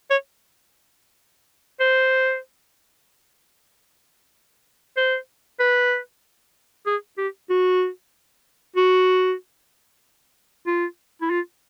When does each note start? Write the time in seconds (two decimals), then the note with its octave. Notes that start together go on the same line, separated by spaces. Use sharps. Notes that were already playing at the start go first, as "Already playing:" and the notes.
0.10 C#5
1.80 C5
4.97 C5
5.60 B4
6.86 G#4
7.18 G4
7.50 F#4
8.76 F#4
10.67 F4
11.21 E4
11.30 F4